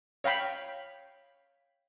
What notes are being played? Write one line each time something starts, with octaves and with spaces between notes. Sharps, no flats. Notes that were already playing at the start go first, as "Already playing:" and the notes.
C#5 F5 G5 B5